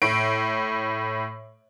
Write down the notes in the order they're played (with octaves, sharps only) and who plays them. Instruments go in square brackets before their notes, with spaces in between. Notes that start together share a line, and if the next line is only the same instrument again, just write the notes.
[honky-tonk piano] A2 D7